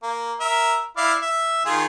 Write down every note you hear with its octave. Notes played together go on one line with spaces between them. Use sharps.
A#3
A#4 E5
E4 D5 F5
E5
D#3 F4 G#4